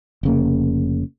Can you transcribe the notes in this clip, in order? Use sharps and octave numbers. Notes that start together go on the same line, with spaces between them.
F1 C#3 A#3